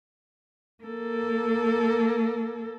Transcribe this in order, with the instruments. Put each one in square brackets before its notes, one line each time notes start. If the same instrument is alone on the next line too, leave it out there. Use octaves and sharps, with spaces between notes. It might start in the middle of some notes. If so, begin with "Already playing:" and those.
[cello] A#3 A4